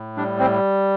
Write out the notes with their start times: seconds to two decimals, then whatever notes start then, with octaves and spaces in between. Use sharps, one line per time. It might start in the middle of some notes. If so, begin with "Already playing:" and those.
Already playing: A2
0.17 G3 D4
0.40 C4